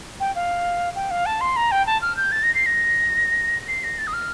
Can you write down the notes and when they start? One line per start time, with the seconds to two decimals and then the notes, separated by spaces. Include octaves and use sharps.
0.20 G5
0.35 F5
0.95 G5
1.11 F5
1.26 A5
1.41 C6
1.56 A#5
1.71 G5
1.86 A5
2.02 F6
2.17 G6
2.32 A6
2.43 A#6
2.55 C7
2.66 A#6
3.68 C7
3.84 A#6
3.98 A6
4.07 D#6
4.13 F6